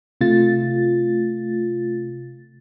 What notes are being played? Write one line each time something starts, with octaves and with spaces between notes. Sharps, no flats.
C3 A3 F4 A6